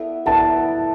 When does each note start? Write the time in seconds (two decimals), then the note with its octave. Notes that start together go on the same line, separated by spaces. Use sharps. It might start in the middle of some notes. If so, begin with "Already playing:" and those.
Already playing: B3 E4 A4 D5
0.26 B3 E4 A4 D5 A5